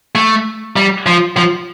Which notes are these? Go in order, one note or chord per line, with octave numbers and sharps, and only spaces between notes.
A3
G3
F3
F3